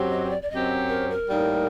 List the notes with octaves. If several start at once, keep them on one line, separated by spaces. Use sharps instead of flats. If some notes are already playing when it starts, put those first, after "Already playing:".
Already playing: F#2 F#3 C4 G4
D#5
C5
D5
D5
F#2 F#3 C4 G4 D#5
A#4
A#4
A2 G3 A#3 D#4